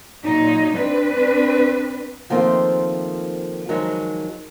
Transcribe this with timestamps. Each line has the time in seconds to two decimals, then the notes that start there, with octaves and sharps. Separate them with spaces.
0.24 A#2 F#3 D#4
0.75 C4 D4 B4
2.30 D#3 F3 A3 A#3 C4
3.69 D#3 F3 F#3 G#3